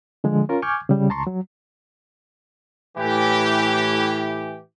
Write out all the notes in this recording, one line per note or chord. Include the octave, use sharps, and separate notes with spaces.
D3 F3 G#3
C#4 F4 A#4
G#5 C#6 D6 F6 G6 G#6
C#3 G3
C#2 A5 A#5 C6 C#6
F#3
A2 E3 G4